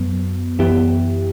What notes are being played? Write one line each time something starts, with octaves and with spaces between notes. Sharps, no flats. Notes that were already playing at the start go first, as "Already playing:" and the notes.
Already playing: F#2 F#3 B3
F#2 E3 B3 E4 G4